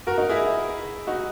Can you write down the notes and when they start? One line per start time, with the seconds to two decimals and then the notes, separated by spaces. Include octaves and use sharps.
0.07 F#4 A#4
0.18 D#4 F#4
0.29 E4 G#4
1.07 D#4 F#4